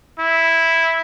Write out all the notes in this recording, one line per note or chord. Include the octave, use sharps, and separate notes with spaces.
E4